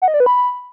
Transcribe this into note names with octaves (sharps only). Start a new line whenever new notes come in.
F#5
D#5
D5
B4
B5